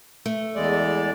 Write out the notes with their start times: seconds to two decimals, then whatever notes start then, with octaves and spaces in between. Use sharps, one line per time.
0.26 A3
0.55 E2 G#3 D5